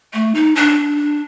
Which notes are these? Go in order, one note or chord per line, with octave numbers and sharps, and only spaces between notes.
A3
D#4
D4